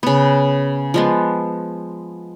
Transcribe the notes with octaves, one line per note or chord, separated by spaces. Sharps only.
C#3 B3
F3 G#3 B3